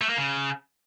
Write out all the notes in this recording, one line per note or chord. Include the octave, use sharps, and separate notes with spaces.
A3
A#3
C#3